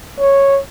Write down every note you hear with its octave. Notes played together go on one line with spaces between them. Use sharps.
C#5